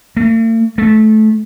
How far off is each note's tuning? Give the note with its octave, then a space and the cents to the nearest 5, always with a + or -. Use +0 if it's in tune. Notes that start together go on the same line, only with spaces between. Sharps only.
A3 +45
A3 -20